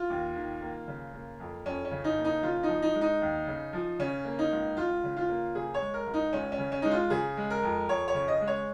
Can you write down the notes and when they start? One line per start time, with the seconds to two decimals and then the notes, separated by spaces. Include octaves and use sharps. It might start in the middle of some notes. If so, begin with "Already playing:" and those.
Already playing: F4
0.10 D#2
0.36 D#3
0.61 A#3
0.88 C#3
1.13 A#3
1.40 F2
1.66 F2 C#4
1.85 C#4
1.91 C#3
2.04 D#4
2.18 A#3
2.24 D#4
2.43 C#3 F4
2.63 D#4
2.69 F3
2.82 D#4
2.95 G#3
3.01 D#4
3.22 D#2
3.47 C#3
3.73 F3
3.99 C#3 C#4
4.25 A#3
4.39 D#4
4.52 C#2
4.76 C#2 F4
5.04 C#3
5.17 F4
5.29 A#3
5.55 C#3 G#4
5.74 C#5
5.81 G#3
5.94 A#4
6.06 C#2
6.14 D#4
6.33 C#2 C#4
6.52 C#4
6.58 C#3
6.72 C#4
6.82 G#3 D#4
6.91 F4
7.10 C#3 G#4
7.37 G#3
7.50 A#4
7.63 F2
7.89 F2 C#5
8.08 C#5
8.14 C#3
8.28 D#5
8.41 G#3
8.47 C#5